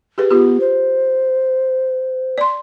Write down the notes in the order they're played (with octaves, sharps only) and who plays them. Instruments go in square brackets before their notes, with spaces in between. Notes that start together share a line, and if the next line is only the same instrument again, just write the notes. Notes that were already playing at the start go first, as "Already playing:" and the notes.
[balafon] G4 G#4 B4
[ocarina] B3 [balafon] F4 G4
[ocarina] C5
[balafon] D5 C6